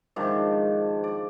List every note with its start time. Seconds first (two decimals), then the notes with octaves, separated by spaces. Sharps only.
0.16 G#2 D#3 F3 D4
1.04 D5